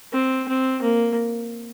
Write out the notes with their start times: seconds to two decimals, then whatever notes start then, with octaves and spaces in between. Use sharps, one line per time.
0.13 C4
0.48 C4
0.82 A#3